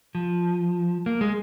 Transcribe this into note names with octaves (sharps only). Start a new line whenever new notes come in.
F3
A#3
G#3